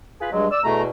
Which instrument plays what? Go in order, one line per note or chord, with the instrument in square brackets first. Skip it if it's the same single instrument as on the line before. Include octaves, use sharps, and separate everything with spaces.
[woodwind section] F4 G#4 B4
[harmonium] G2 G#3 [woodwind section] F#3
[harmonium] D5 [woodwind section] E6
[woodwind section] E2 B2 [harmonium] A3 A#5